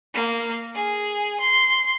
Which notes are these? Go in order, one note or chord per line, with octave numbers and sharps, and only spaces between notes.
A#3
G#4
C6